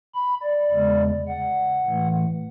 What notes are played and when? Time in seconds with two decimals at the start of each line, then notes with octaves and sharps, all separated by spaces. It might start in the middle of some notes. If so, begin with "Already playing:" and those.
0.15 B5
0.43 D5
0.71 E2 C#3 G#3
1.28 F#5
1.85 A2 E3 A3